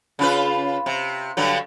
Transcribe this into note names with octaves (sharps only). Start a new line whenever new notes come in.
C#3 F4 B4
C3
G2 D3 F#3